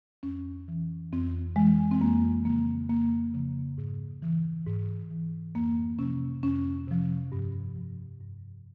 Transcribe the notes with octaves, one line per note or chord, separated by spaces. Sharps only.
F2 C#4
E3
F2 C4
E3 G#3
C4
F2 A#3
C#3 F3 A#3
F2 A#3
C#3 F3
G#2
E3
G#2
E3
F2 A#3
C3 F3 C#4
F2 C#4
C3 F3
G2
F3
G2